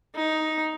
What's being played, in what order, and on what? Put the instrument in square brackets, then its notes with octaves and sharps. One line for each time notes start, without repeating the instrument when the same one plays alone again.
[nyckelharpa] D#4